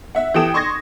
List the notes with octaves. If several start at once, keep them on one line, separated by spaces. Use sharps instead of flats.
E5 F#5
E3 G4 A4 G5 D#6 E7
C6 C#6 D#6 G#6 A#6